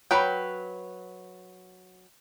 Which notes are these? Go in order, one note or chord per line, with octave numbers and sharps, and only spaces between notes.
F#3 B4 G5